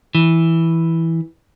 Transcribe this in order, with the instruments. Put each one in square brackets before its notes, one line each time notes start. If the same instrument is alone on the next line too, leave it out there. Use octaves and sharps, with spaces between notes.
[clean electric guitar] E3